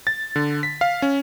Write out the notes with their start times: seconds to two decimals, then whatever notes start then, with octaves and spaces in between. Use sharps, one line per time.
0.07 A6
0.36 D3
0.63 B6
0.81 F5
1.02 C#4